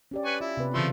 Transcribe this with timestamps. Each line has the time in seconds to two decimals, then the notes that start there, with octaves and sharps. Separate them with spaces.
0.11 C#4 G4 D5
0.25 B4 G#5 C#6
0.41 E4 F4
0.57 C3 B3 B4
0.74 C#3 E3 F3 A3 F4 C6